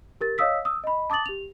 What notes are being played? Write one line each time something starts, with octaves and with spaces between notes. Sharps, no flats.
G4 A#4 A6
C#5 D#5 F5 D#6 E6 B6
D#6 E6
D#5 B5
A5 D6 D#6 A6 F#7
G4 F7